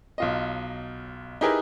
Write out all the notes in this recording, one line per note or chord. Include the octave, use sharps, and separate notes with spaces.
B1 F4 D#5
D#4 E4 G4 G#4 A#4 B4